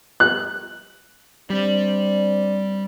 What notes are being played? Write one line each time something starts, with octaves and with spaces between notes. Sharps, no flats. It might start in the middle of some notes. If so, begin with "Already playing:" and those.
F#6
G3 C4 D4 D5